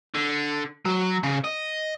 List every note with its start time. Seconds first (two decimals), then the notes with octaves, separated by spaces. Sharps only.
0.14 D3
0.85 F#3
1.23 C#3
1.44 D#5